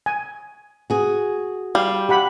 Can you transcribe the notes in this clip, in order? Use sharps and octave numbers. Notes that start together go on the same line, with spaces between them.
G#5
F#4 G#4
G3 F5
G4 F#5 B5